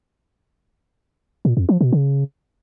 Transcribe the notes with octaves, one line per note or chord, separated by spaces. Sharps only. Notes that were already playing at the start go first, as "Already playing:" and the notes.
A#2
F2
F3
B2
C#3